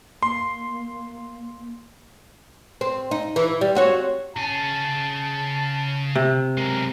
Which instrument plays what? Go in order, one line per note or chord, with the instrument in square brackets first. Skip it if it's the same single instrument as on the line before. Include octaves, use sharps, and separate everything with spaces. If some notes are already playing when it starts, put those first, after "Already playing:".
[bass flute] A#3 [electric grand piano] C6
[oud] C4
D#4
E3
G3
C4 F#4 C#5
[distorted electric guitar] C#3 G#5 [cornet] A5
[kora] C3
[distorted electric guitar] B1 G#3 [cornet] A#4